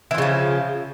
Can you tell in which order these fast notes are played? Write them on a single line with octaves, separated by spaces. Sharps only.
E3 F4 C#3 F3